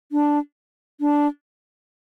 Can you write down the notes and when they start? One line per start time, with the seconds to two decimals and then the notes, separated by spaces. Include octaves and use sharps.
0.12 D4
1.00 D4